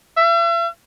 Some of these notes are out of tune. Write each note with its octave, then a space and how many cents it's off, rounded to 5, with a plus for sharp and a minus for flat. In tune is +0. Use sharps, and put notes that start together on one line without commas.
E5 +45